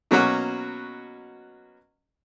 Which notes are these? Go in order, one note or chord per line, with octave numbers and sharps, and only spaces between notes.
B2 F#3 A#3 C#4 F#4